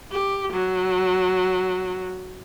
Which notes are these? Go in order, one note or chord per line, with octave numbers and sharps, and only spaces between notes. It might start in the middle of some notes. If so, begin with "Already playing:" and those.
G4
F#3